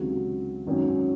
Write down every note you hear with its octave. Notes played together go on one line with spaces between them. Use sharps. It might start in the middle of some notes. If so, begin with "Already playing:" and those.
Already playing: C#2 C3 D#3 F#3
G#1 F#2 D#3 F#3 C#4